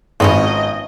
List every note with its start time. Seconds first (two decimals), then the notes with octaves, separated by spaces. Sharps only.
0.20 G#1 F3 B3 C#4 D#5